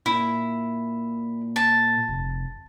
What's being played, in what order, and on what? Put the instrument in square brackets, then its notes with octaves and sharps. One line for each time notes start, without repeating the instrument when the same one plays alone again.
[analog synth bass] A#2 [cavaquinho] E4
[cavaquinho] A5
[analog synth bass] F1